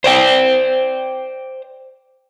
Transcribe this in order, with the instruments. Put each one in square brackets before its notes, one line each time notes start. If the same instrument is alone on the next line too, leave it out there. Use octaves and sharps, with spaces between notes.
[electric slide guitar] C5 D5 G5